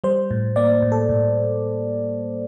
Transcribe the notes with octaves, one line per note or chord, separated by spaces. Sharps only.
G3 C5
A2
A#3 D5
A2
A4
A2